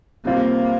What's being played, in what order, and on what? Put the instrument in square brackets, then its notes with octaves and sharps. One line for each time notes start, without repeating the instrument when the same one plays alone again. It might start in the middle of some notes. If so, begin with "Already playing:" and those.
[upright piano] C3 G3 C4 F4 [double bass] A#3